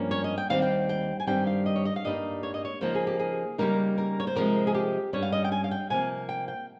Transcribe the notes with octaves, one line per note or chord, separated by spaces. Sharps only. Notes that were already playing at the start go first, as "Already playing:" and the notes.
Already playing: G2 F3 A#3 C#4
C#5
D#5
G5
D#2 D#3 G3 C4 F5
G5
G5
G#5
G2 D#3 G3 C4 G5
F5
D#5
C#5
D#5
F5
G2 G3 A#3 D#4 D#5
C#5
D#5
C#5
C#3 F3 A#3 D#4 C5
G#4
G4
G#4
C#3 G3 A#3 D#4 A#4
A#4
C#5
C5
C3 F3 G#3 A#4
G#4
G4
G2 G3 C#4 C#5
F5
D#5
G5
G#5
F5
G5
C3 F3 A#3 G#5
G5
G5